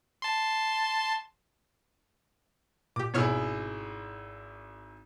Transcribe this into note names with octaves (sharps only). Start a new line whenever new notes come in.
A5 C6
A#2 G4 D6
G#1 B2 E4 G#4 C#5 F6